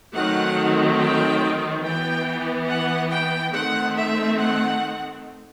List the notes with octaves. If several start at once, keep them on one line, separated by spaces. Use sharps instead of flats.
D#3 F#3 A3 C4 F#5
G5
E3 B3 G5
F#5
G5
D#3 A3 C4 F#5
E5
F#5